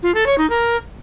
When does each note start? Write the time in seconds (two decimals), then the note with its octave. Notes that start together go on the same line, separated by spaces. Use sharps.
0.03 F4
0.15 A4
0.26 C#5
0.38 D#4
0.50 A#4